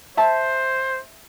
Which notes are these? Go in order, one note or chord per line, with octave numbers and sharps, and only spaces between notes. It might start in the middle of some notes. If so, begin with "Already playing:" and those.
C5 E5 A5